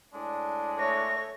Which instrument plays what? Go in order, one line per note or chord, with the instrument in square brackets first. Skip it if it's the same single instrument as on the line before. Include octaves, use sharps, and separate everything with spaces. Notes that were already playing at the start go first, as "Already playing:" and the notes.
[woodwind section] A2 G#3 D4
[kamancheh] A3 C#5 [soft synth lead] A#6